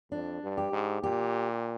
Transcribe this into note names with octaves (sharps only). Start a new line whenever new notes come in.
F2 D4
G2
G4
G#2
A#2 G4